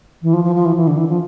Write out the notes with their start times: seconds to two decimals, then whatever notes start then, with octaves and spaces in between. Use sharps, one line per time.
0.22 E3
0.33 F3
0.44 F3
0.55 F3
0.65 E3
0.76 E3
0.87 D3
0.97 E3
1.08 F3